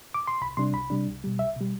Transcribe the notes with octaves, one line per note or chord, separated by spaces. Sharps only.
D6
C6
C2 B5
C3 G3 D4 C6
C2 B5
C3 G3 D4
C2
B2 G3
C2 E5
B2
G3